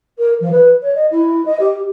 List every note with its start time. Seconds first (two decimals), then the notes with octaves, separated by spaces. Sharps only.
0.18 A#4
0.40 F3
0.51 B4
0.82 C#5
0.95 D#5
1.11 E4
1.45 D#5
1.59 G4